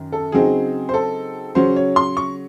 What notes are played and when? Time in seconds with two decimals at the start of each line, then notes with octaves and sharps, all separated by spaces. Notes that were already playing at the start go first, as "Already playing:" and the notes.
Already playing: F#2 D#3
0.12 A4
0.32 C#3 F#3 C4 D#4 G#4
0.89 C5
0.94 A4
1.55 C#3 F#3 C#4 C5
1.76 C#5
1.96 C6
2.17 C#6